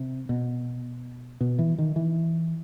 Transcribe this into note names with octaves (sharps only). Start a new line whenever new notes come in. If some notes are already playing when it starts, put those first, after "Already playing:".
Already playing: C3
B2
B2
E3
D#3
E3